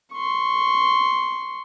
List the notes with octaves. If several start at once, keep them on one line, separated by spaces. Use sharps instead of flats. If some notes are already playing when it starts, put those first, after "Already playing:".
C6 C#6